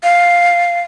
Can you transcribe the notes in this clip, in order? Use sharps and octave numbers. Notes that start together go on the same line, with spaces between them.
F5